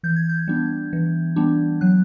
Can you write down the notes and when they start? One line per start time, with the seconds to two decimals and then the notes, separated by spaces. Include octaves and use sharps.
0.03 E3 G6
0.16 G#6
0.29 G6
0.48 G3 B3 D4
0.93 E3
1.36 G3 B3 D4
1.81 F#3 F#6